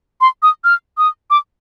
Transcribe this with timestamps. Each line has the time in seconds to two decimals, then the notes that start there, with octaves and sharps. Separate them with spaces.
0.21 C6
0.43 D#6
0.64 F6
0.98 D#6
1.30 D6